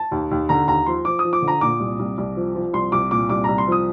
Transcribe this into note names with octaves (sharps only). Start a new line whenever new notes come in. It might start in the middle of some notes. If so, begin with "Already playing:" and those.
Already playing: A5
D#2
D#2
D3 A#5
D#2 A#5
F3 C6
F3 D6
D#6
F3
D6
D3
A#5
A#2 D6
C2
C2
C2
F3
F3
C2 C6
C2 D6
A#2 D6
C2 D6
C2 A#5
C6
F3 D#6